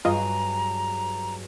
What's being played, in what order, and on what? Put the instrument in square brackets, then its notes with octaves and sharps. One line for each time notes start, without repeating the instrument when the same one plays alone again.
[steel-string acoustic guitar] G2 F#3 G#4 [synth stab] F4 D#5 [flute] A#5